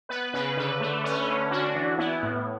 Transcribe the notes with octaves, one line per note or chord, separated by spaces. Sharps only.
B3 B4
C#3 B4
D3 B4
A3
C#4
D3
D4 F#4
E3
B3 E4
A2